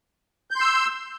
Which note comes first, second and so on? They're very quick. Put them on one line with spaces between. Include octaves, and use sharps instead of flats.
G6 C6 E6